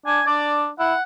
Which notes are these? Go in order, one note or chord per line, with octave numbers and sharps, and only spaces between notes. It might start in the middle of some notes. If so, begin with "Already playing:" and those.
D4 G#5
D4 D5
E4 F#5